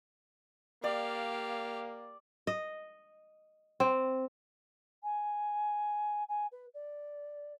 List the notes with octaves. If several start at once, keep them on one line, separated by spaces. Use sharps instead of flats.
A#3 G4 D5 F5
D#5
C4
G#5
G#5
B4
D5